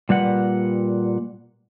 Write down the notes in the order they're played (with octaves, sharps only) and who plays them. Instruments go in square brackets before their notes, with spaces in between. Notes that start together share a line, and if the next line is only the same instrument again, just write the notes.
[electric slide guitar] A#2 G3 B4 F#5